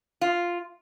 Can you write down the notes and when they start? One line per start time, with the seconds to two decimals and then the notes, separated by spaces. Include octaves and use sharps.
0.21 F4